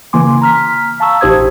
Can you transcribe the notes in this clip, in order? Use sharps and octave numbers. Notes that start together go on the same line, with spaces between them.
C#3 E3 A#3 G#5 C6 D6
A#5 F6 B6
F5 A5 A#5 C#6 E6
A1 D#4 G4 C5 D#6 G#6